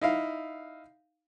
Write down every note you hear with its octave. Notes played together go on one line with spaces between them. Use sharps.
D#4 E4 F5